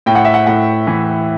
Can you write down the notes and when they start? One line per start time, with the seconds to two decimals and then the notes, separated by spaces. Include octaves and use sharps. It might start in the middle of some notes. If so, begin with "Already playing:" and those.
0.06 A2 G5
0.15 F#5
0.25 E5
0.34 F#5
0.47 A2 F#5
0.87 E3